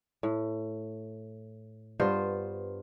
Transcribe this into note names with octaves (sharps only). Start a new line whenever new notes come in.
A2
G2 B3 F4 C5